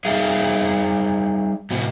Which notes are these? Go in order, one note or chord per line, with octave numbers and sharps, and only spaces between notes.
G3 D#4 G#4 E5 F5
A2 C3 F#4